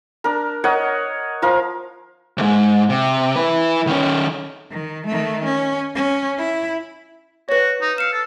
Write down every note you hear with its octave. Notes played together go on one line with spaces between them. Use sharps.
D4 A#4
A#4 C#5 D#5 F#5
F3 A#4 F5
D2 G#2
C3
E4 B4
D#3 C#4
D#3
D#3 A3
C#4
C#4
E4
F#4 B4 C#5
D#4
F5 E6 C#7 E7
A4